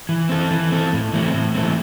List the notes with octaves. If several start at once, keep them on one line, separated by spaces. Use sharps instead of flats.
E3
C4 A4
E3
C4 A4
A2
E3 A3 C4
A2
E3 A3 C4